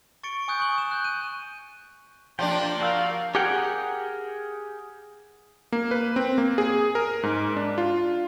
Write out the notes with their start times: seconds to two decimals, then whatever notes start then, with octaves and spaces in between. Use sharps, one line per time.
0.23 C#6 A6 C#7 D7 G7
0.48 G#5 C#6 D#6 F#6 G6 D7
0.60 C#6 F#7 G7
0.78 E7
0.91 F#6 G6
1.04 D#7
2.39 F3 A#3 D4 G4 D5 G5
2.80 F#4 A#4 D5 F5 E6 G6
3.35 G4 G#4 A#4 F#5 G5
5.72 A#3
5.91 B4
6.16 C4
6.38 A#3
6.58 G#4
6.95 A#4
7.23 G#2
7.56 D4
7.78 F4